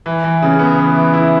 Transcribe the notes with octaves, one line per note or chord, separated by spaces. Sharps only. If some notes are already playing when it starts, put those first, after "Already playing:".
E3
E3
C#3
B3
E3
E3
E4